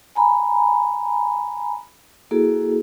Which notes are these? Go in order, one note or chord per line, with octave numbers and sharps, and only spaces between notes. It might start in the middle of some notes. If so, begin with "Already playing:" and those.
G#5 A#5 B5
A#3 E4 F#4 G#4 A4